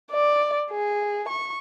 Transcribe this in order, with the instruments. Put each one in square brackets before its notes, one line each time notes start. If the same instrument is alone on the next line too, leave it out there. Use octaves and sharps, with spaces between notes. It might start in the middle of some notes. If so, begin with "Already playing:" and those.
[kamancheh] D5
G#4
C#6